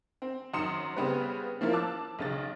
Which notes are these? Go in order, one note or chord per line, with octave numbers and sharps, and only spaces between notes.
C4
F#2 D#3 C6 D#6 C#7 E7
C#3 G3 B3 C4 G4 B4
F3 A#3 C#4 E4 F4 A#4
A5 D6 E6 F#6
B1 C#3 A6